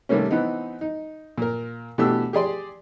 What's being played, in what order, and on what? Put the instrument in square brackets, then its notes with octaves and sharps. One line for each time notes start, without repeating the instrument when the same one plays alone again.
[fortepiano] C3 D#3 G3 A3 A#3 C#4
E3 B3 C4 D#4
D#4
A#2 A#4
B2 E3 A3 D4 G4 E6
G4 G#4 D5 C6